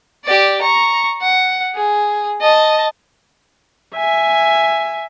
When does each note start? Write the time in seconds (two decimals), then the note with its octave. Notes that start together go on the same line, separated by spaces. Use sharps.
0.25 G4 D5
0.62 A#5 C#6
1.21 F#5
1.75 G#4
2.41 D#5 A5
3.96 E5 G#5